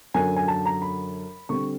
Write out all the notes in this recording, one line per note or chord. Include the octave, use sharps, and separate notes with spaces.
F#2 D3 F#3 G#5
G#5
A5
A#5
B5
D3 G3 C4 C#6